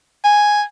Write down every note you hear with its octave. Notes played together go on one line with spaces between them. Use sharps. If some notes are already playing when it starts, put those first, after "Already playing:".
G#5